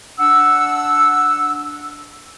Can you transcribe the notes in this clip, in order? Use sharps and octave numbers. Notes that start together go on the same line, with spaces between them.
D4 F#5 E6